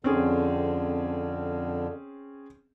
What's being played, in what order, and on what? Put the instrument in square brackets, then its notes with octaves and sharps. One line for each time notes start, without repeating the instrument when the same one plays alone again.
[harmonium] F2 D3 [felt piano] C4 C#4 G#4